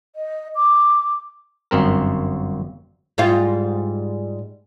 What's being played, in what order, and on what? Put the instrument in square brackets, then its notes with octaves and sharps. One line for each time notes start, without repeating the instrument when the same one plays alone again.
[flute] D#5
D6
[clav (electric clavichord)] G1 F#2 C4 A#4
[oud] G#2 G3 F4